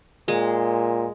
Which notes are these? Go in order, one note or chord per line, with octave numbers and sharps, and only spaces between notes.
A#2 G#3